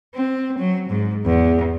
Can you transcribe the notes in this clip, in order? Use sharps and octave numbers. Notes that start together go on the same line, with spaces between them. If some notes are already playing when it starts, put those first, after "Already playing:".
C4
F#3
G#2
E2